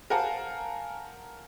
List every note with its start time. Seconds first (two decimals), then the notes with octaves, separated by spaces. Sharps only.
0.10 A#4 C5 F5 F#5 G#5 A5